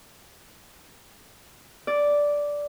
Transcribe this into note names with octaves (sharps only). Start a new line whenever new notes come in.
D5